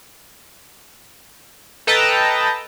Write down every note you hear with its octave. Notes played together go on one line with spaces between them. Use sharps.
A4 B4 D#5 G5 A5 A#5